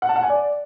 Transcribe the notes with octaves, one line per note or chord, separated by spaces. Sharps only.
F#5
A5
F#5
G#5
D5